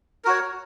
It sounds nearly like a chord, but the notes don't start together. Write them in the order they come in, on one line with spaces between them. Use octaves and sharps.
A#4 F#4 C#5